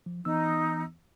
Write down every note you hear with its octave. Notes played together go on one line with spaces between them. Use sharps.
F3
E3 B3 D#4 E6